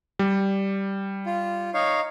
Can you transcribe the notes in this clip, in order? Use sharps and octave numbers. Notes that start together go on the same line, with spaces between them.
G3
F4
D#4 C#5 F5